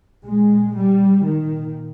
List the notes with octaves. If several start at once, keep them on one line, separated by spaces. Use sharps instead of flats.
A#2 G#3
G3
A#2 D#3